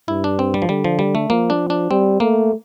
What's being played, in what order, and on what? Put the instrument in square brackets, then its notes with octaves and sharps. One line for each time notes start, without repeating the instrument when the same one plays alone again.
[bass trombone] G2 [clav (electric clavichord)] E4
[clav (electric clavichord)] D4
C4
G3
F3
[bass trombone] D3 [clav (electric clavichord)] G3
[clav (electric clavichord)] F3
G3
A3
[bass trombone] F3 [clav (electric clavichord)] A#3
[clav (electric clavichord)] D4
D4
[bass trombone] G3 [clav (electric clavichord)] C4
[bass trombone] A3 [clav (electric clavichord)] A#3